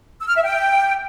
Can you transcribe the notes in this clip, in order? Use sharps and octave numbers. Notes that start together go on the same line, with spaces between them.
E6
F6
E5
G5